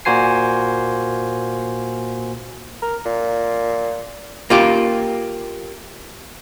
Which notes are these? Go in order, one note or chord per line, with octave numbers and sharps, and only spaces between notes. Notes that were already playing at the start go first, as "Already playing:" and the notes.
A#2 A#3 F#4 C5 G#5 C7
A#4
A#2
A#3 F4 G4